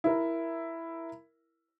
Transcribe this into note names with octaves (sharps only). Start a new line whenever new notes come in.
E4 A#4